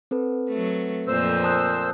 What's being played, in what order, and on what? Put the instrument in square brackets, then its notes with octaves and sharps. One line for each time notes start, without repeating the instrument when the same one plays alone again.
[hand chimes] C4 A4 B4
[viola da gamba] F#3 A3
[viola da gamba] F2 A#3 [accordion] A#2 C5 E6
[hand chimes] A5 D#6 F#6